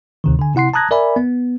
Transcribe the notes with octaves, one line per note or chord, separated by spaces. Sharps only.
D2 C3 D#3
D3 G#5
C3 E4 F#5 C6 C7
A5 A#5 D#6 F#6 G#6 A#6
A#4 D5 E5 G#5 B5
B3